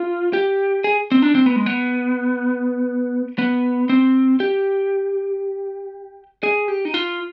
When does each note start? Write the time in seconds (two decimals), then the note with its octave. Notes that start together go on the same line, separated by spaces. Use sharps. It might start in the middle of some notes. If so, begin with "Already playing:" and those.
Already playing: F4
0.33 G4
0.84 G#4
1.12 C4
1.22 D4
1.35 C4
1.46 B3
1.56 G#3
1.66 B3
3.38 B3
3.89 C4
4.40 G4
6.43 G#4
6.68 G4
6.85 D#4
6.94 F4